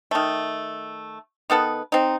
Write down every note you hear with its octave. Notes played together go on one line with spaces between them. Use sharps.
D#3 A3
D#3 B3 A4 B4
C4 D#4